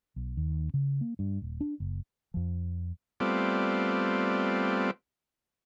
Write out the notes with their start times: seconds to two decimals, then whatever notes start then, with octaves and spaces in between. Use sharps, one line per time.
0.16 B1
0.37 D#2
0.74 C#3
1.01 A#3
1.19 G2
1.42 D#1
1.61 D4
1.80 F#1
2.34 F2 F3
3.20 G3 A3 B3 C4 F4 D5